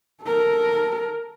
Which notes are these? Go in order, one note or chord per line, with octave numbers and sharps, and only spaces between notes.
A4 A#4